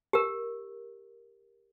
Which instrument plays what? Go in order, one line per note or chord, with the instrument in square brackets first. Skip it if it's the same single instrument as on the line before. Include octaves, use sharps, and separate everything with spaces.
[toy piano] G4 A#4